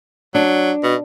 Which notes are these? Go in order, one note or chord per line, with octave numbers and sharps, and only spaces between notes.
F#3 D4
B2